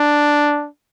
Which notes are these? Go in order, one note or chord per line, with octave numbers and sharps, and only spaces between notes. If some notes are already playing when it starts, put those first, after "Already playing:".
Already playing: D4